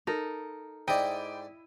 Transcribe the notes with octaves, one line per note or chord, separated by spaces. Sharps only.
D#4 A4 A#4
G#2 E4 D5 D#5 G5